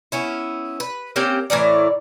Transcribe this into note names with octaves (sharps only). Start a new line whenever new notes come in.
B3 C#4 E4
B4
A#3 C4 C#4 G4
A2 E3 A#4 D5